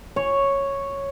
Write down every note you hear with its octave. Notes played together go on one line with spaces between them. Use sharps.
C#5